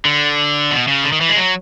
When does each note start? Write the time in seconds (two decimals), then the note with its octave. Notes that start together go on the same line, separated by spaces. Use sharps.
0.05 D3
0.71 B2
0.88 C#3
1.04 D3
1.12 D#3
1.21 E3
1.29 G#3
1.37 F#3